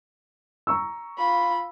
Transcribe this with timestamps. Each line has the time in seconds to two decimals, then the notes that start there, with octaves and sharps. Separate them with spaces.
0.67 A#5 C#6 E6
1.18 F4 B5